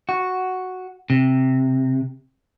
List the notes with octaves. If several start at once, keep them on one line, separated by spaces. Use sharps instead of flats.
F#4
C3